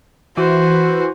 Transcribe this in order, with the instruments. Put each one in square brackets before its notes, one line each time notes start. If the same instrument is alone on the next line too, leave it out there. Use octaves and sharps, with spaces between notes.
[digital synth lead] E3 [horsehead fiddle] F#4 C5